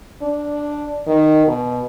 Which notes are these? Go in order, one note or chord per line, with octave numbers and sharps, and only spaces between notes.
D4
D#3
B2